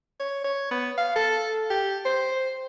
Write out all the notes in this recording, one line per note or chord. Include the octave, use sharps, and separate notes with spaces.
C#5
C#5
B3
F5
A4
G4
C5